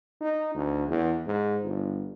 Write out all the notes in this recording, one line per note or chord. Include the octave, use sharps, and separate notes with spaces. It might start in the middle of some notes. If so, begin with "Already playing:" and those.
D#4
D2
E2
G#2
G1